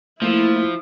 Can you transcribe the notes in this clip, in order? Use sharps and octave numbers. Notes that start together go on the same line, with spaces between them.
F3 A3 A#3 E4